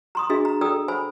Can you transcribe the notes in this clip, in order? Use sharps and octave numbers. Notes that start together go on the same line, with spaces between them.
A#5 C6 D#6
D4 F#4 G#4 D#5 E5
A#5
A4 D5 G5 A#5 D#6 E6
C5 E5 G#5 B5